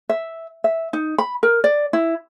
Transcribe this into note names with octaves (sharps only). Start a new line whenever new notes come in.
E5
E5
D#4
B5
A#4
D5
E4